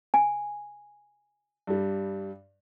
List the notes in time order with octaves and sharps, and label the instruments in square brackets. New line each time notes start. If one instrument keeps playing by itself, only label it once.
[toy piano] G#5
[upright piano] G2 G3